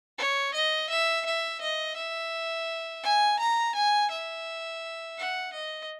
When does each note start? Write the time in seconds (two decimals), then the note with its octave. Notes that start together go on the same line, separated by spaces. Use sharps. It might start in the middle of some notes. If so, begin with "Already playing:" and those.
0.18 C#5
0.54 D#5
0.89 E5
1.25 E5
1.61 D#5
1.96 E5
3.03 G#5
3.39 A#5
3.75 G#5
4.10 E5
5.18 F#5
5.53 D#5